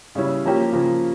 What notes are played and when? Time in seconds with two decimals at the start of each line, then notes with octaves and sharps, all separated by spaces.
0.15 C#3 G3 C#4 E4
0.44 F3 A#3 C#4 G4
0.72 C#3 F3 A#3